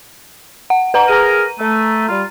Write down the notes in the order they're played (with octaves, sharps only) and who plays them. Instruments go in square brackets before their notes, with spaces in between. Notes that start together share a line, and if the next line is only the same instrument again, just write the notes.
[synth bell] F#5
B4 F#5 A#5
[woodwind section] G#4 A#4 [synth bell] A#5 D#7
[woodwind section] A3
G3 F4